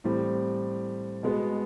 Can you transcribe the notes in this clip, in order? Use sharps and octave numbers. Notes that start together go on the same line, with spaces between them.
A2 E3 G3 C4
B2 G#3 B3